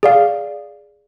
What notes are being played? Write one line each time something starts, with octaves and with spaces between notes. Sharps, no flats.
G#4 D5 F5